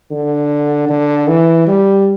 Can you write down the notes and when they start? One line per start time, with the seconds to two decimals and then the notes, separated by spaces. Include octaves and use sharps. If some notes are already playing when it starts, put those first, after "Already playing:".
0.11 D3
0.89 D3
1.28 E3
1.67 G3